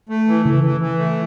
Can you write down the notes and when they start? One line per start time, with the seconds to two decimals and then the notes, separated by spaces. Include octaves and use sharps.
0.09 A3
0.28 E3
0.45 C#3 E3
0.64 E3
0.81 E3
0.98 A3